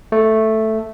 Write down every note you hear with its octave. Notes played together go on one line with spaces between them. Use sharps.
A3